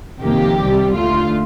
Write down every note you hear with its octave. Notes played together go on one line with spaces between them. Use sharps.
F2 C3 D#3 A#3 G4
C2 C3 G3
D#2 D3 A3 F4